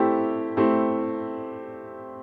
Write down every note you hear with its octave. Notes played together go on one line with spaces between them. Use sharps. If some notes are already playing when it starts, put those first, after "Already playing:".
Already playing: A3 C4 E4 G4
A3 C4 E4 G4